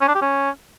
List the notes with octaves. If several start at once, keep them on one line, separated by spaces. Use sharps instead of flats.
C#4
D4
G4
C#4